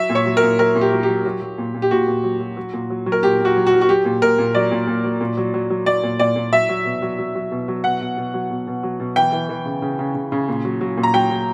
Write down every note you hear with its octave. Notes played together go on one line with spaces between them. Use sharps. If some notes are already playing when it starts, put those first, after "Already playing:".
Already playing: F#3 E5
A#2
C#5
F#3
A#4
A#2
F#3 A#4
A#2
G4
F#3
G4
F#3
F#3
F#3
A#2
A#2
G4
A#2 F#4
A#2
F#3
F#3
F#3
A#2
F#3
F#3
A#4
A#2 G4
A#2
F#4
F#3
F#4
F#3
F#4
F#3 G4
A#2
A#2 A#4
A#2
F#3 D5
A#2
A#2
F#3
A#2
F#3
F#3
F#3
F#3 D5
A#2
A#2 D5
A#2
F#3 E5
F#3
B2
F#3
F#3
F#3
B2
F#3
B2 F#5
B2
B2
F#3
B2
B2
F#3
B2
E3 G5
E3
E3
C#3
C#3
C#3
C#3
C#3
A#2
F#3
F#3
A#2
A#5
F#3 G5
F#3